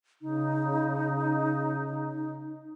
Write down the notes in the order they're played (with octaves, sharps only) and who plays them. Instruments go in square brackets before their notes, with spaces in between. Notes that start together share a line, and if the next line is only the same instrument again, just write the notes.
[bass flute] C#3 [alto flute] D#4